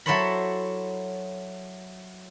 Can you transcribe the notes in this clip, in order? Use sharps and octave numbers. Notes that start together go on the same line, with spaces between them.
F#3 E4 A4 C5 C#5 B5